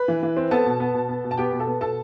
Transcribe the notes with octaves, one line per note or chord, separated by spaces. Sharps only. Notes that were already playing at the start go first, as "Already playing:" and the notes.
Already playing: B4 B5
E3
E3
C4
B3 A4 A5
B2
B3
B2
B3
B2
A5
B3 G4 G5
B2
A4 A5
B3
B2 A4 A5